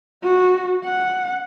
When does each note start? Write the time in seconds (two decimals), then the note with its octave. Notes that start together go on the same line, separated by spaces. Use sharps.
0.23 F#4
0.85 F#5